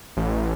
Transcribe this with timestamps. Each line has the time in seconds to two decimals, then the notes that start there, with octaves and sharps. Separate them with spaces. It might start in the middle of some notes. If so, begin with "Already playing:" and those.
0.17 A1